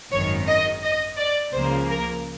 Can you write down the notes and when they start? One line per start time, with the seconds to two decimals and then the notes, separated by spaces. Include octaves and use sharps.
0.12 G#1 F#2 D#3 C#5
0.47 D#5
0.83 D#5
1.17 D5
1.53 C#2 C#3 F3 A#3 C5
1.89 A#4